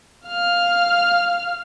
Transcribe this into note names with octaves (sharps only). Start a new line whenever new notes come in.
F5 F6